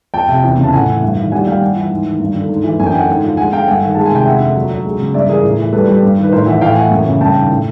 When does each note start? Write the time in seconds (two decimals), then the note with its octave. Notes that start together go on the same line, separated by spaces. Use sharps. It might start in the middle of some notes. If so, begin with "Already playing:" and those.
0.14 F2 G5 A5
0.28 C3
0.44 E2
0.58 C#3
0.63 A5
0.73 A2 F#5 G#5
0.88 E3
1.03 G2
1.17 D#3
1.32 G3 F#5 G#5
1.47 G3 F5 G5
1.61 G2 F#5 G#5
1.76 E3
1.90 G#2
2.05 D#3
2.20 G2
2.35 D3
2.49 G#2
2.64 E3
2.80 F#2 G#5
2.86 G5
2.93 D3 F#5 G#5
3.09 G#2
3.23 F3
3.37 G#3 F#5 G#5
3.53 D3 F5 G5
3.68 G2 F#5 G#5
3.82 D#3
3.95 G#3 A5
4.06 G#5
4.11 C3 G5
4.26 F2 E5 F#5
4.40 D3
4.56 F#3
4.70 F#3
4.85 G#3
4.99 C#3
5.14 G2 D5 E5
5.29 E3 G#4 A#4
5.43 A2
5.58 E3
5.73 G3 A4 B4
5.87 G3
6.03 G2
6.17 D#3
6.23 B4
6.32 A2 A#4 C5
6.46 E3 E5 F#5
6.61 A2 F5 G5
6.76 E3 F#5 G#5
6.91 F#2
7.06 C#3
7.21 G2 G5 A5
7.35 D#3
7.50 A2